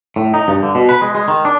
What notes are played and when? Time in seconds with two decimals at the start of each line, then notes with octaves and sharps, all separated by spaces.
0.16 A2
0.34 D#4
0.48 G2
0.63 D3
0.75 B2
0.89 B4
1.02 G#3
1.15 G#3
1.28 D#3
1.45 D4